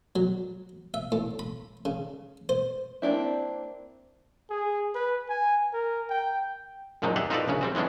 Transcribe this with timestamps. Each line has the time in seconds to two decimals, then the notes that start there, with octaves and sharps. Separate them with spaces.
0.16 F#3
0.94 E5
1.12 A2
1.39 B5
1.85 C#3
2.49 C5
3.02 A#3 C4 D4 E4
4.50 G#4
4.95 B4
5.30 G#5
5.73 A#4
6.10 G5
7.02 F#2 A#2 F3 F#3 G#3 D#4
7.16 G4 G#4 D5 E5 F#5 G5
7.30 D#4 F4 F#4 A4 B4 D5
7.48 A#1 C#3 C#4
7.61 G3 C4 F#4
7.75 E3 G#3 B3 C#4 D4